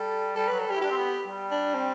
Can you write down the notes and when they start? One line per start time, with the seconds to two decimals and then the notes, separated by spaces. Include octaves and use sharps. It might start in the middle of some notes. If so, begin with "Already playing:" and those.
Already playing: G3 A4
0.36 G3 A4
0.48 F#3 B4
0.60 A4
0.67 G3 G4
0.76 E4
0.82 D4 G4
0.90 C4
0.97 B3
1.28 G3
1.51 D4
1.74 C4